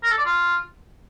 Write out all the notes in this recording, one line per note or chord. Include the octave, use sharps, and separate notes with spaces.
A#4
A4
D5
F4